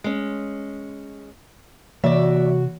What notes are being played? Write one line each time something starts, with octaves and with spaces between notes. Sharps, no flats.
G#3 C#4
C3 E3 F#4 D5 E5